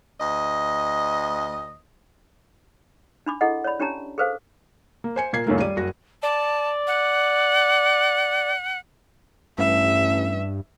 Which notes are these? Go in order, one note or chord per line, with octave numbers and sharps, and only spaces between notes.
D2 D#5
D4 B5 D6
E4 G#4 A4 D#5 F#5
C#5 D5 B5
C#4 D4 G4 C#5 A5 A#5
G#4 A4 B4 C5 F5
A#3
C5 G#5 C#7
A#2 A#3 G#6 C7
C#2 F#2 A#2 D#3 A3 A#3
G3 D5 D#7
F#1 F#4 A#6
D5 A5
F#5
A1 G2 E5